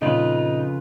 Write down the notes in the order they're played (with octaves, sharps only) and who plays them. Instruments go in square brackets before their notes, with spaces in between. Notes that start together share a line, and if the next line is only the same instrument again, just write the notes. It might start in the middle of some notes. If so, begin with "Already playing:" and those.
[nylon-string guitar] F2 [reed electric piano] A#2 D#5 [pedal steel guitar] C#3 F4 B4 [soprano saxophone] D#4